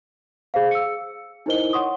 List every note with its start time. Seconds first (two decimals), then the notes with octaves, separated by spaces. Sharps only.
0.54 G#4 C5 F5
0.71 E6 C#7
1.46 D#4 E4 A#4 C5 D#5 G7
1.73 C#5 F#5 C6 C#6 D#6